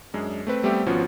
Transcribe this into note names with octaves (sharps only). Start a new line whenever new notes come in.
F#2 G#3 D4
A3 C4 B4
G3 A3 B3 C4 G4 E5
G#1 F3 B3 C#4 F4 F#4